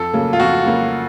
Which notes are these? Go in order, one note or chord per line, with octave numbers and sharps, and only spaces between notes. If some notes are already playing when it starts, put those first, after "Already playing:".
Already playing: F2 A4
C#3 F#3 A#3
F4
F2 F#4
C#3 F#3 A#3